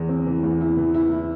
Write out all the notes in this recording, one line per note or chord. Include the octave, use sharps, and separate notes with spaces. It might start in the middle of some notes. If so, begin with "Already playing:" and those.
Already playing: E2 E3
C4
E3
E2
E4
E3
E4
E4